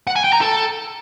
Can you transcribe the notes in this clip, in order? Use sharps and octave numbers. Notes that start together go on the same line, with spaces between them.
F#5
G#5
G5
A#5
A4